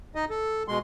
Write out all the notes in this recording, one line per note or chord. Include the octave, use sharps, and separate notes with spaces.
D#4 D#5
A4
B2 G#3 C6